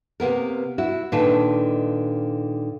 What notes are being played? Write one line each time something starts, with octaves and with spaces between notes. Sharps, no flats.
C3 A#3 B3 A#4
E4 F#4
A#2 D3 D#3 D#4 B4 A5